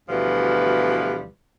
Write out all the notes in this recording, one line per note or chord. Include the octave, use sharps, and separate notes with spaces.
D2 B2 E3 F3 G3 B4